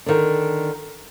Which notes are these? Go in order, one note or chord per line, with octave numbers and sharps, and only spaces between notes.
D3 D#3